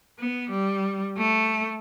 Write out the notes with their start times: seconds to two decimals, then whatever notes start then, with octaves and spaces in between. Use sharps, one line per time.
0.19 B3
0.50 G3
1.17 A3